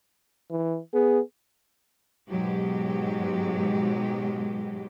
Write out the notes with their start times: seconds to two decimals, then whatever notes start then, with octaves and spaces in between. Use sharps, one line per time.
0.50 E3
0.94 B3 G#4
2.29 G#2 B2 F#3 G#3 G4